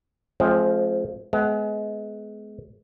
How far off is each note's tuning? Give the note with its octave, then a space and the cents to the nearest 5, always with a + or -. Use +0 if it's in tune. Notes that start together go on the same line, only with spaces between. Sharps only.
F3 +0 G#3 +40 C4 +25
G#3 +30 B3 +25